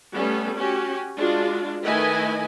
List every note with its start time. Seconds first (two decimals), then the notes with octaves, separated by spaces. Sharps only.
0.13 G3 A3 B3 C#4 A4
0.54 C#4 F#4 G4
1.15 G#3 D4 F4 F#4
1.84 D#3 A3 E4 B4 D#5 G#5